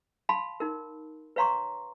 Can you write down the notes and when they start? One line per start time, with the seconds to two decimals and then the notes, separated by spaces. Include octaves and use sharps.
0.29 F5 A5 B5 C6
0.60 D#4 A#4
1.36 B4 C#5 F5 A#5 C6 C#6